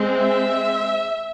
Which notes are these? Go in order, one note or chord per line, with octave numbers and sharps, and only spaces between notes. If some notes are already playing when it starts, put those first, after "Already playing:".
Already playing: G#3 C4
E5